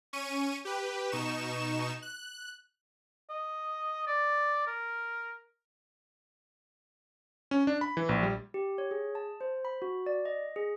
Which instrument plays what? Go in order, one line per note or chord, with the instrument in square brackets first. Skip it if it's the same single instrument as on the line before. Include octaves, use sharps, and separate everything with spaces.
[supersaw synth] C#4 C#6 D#7
G4 B4
B2 D#4 C#6 E7
F#6
[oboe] D#5
D5
A#4
[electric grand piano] C#4
D4
B5
E3
A#1
G3
[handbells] G4
C#5
G#4
A5
C5
B5
F#4
D5
D#5
G#4